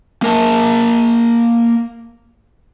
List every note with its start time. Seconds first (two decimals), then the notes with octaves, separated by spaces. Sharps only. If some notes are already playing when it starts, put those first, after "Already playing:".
0.22 A#3 A#4 G#5 A5